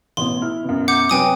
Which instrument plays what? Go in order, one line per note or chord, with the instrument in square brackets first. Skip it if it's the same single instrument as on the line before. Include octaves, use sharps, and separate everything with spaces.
[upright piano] A1 B2 [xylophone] C6
[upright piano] E4 F6
F#2 B2
[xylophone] F#5 D6 G6
[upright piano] C3 F#3 B4 [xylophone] G5 G#5 D#6